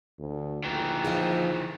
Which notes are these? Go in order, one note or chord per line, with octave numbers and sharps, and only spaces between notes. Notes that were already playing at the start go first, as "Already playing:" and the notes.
D2
A#1 D#3 E3
F3 D#4 G#4